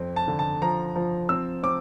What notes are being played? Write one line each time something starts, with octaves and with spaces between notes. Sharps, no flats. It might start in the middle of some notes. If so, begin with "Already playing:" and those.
Already playing: F2 C4
A5
D3
A5
F3 A#5
F3
C4 E6
C4 D6